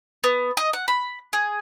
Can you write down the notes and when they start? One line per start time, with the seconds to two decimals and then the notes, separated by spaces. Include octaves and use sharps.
0.24 B3
0.57 D#5
0.73 F#5
0.88 B5
1.33 G#4